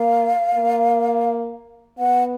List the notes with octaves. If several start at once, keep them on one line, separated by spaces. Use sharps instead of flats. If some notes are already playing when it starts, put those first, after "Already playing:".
Already playing: A#3 F5
A#3
B3 F#5